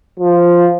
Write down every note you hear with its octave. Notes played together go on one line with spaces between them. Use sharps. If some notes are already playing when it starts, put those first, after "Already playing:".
F3